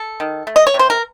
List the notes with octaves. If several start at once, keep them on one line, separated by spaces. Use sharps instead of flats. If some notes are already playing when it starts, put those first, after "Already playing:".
Already playing: A4
D#3
A3
D#5
C#5
C3
C5
A#4